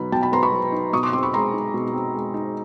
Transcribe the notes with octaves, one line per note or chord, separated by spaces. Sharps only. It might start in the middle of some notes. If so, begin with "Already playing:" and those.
Already playing: B2 F#3 B3 D#4 B5
B2 G5 A5
A5 B5
B3 A#5 C6
B5 C#6
F#3
D#4
B2 C#6 D#6
C6 D6
C4 C6 D6
B5 C#6
G#3 A#5 C6
D#4
B2
C4
G#3
D#4